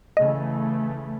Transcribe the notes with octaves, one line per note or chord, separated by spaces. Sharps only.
C#3 E3 A3 D#5